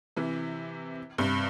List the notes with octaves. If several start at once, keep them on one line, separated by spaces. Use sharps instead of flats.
C3 E3
G2 C3